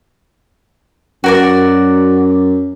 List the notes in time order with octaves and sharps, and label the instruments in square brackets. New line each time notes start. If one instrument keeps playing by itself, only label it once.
[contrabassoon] F#2 [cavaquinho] F#4 A#4 D5